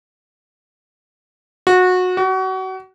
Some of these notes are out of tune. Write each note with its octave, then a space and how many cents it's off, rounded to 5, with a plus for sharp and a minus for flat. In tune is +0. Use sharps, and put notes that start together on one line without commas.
F#4 -20
F#4 +30